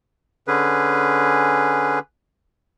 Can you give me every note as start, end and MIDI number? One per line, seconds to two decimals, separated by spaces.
0.48 1.99 50
0.48 1.99 61
0.48 1.99 68
0.48 1.99 71